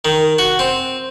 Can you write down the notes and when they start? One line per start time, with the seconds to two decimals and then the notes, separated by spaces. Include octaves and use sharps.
0.05 D#3
0.38 F#4
0.59 C4